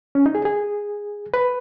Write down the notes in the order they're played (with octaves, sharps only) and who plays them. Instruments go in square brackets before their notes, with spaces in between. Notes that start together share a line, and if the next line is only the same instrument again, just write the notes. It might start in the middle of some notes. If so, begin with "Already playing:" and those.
[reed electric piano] C#4
D#4
G#4
G#4
B4